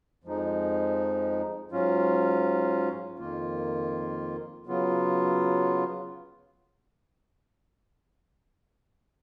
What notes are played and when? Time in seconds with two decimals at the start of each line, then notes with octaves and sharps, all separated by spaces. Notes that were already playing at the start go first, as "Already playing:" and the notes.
0.24 F2 F3 G#3 D#4
1.71 G#2 F#3 C#4 F4
3.19 F2 D#3 A#3 F4
4.66 C#3 F#3 B3 F4